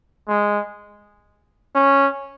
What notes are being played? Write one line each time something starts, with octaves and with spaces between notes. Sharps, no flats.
G#3
C#4